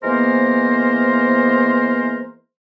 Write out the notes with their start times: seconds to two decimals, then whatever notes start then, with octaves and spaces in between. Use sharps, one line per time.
0.03 E3 G#3 A#3 B3 A#4 C5